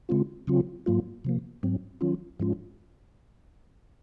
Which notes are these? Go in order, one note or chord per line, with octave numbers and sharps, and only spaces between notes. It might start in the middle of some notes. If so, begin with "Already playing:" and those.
C#3 G#3 C4 F4
C#3 F#3 C4 F4
G#2 F#3 A#3 F4
C3 F3 A#3
G#2 F#3 C4
D#3 F#3 C#4 F4
G#2 F3 G#3 C#4 F4